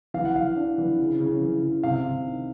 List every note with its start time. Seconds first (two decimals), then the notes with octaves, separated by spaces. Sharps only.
0.14 E3 F5
0.25 F#5
0.35 E3 F5
0.56 D4
0.78 E3
0.99 C#3
1.20 C#3
1.41 E3
1.62 C#3
1.83 C3 F5
2.04 C3
2.26 D#3